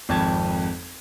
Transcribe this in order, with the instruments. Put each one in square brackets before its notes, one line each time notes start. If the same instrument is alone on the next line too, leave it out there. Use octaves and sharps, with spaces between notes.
[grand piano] G#1 F2 A5 G#6